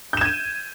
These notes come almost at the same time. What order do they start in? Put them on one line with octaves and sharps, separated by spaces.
G6 E7 G#6 D#7